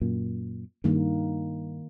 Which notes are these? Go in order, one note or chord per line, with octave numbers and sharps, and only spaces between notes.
F#2 A#2
G2 D#3 A#3